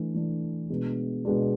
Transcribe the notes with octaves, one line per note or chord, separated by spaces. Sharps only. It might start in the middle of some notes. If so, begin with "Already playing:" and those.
Already playing: E3 A3 D4
E3 A3 D4
B2 G#3 B3 D4
B2 G#3 B3 D4